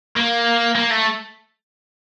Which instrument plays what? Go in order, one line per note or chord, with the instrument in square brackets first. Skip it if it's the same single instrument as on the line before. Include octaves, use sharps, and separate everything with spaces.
[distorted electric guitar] A#3
A#3
A3